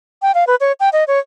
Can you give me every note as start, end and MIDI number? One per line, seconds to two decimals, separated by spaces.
0.22 0.32 79
0.35 0.44 77
0.47 0.55 71
0.61 0.72 73
0.80 0.89 79
0.93 1.04 75
1.08 1.19 73